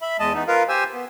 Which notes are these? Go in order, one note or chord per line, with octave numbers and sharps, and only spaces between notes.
E5 B5
E2 G#3 D#5 A5
E3 B3 D#4
F4 A#4 B4 F5
G4 C5 G#5 E6
B3